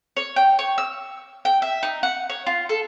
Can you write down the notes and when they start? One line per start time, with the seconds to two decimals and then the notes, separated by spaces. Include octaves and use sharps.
0.17 C#5
0.36 G5
0.59 C#5
0.78 E6
1.45 G5
1.62 E5
1.83 D#4
2.03 F#5
2.29 C#5
2.46 F4
2.69 A4